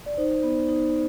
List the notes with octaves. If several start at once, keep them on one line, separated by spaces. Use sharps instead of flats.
D5
D#4 C5
B3
D#4